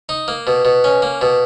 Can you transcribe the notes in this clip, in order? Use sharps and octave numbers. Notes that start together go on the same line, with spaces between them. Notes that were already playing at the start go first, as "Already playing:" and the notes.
D#4
A#3
B2
B2
C#4
A#3
B2